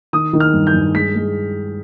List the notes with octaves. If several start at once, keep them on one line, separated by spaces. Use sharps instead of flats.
D#3 D#6
D#3
F6
G2
G6
G2
G#3 B6
G#3